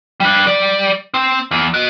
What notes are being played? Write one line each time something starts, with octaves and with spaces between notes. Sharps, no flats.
G3 D4
G3 D5
C4
E2
F#4 D#5